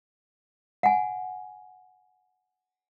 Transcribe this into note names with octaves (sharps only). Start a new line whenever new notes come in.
F#5 G#5